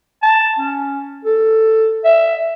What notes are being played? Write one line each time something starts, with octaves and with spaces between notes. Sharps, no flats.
A5
C#4
A4
E5